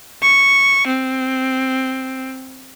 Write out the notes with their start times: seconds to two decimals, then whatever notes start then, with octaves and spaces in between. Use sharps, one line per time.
0.22 C#6
0.87 C4